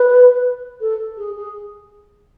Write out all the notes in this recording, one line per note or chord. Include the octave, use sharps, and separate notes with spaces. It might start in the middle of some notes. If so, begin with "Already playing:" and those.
Already playing: B4
A4
G#4
G#4